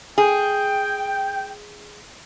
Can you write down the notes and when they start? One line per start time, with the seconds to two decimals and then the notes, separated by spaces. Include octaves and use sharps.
0.18 G#4 G5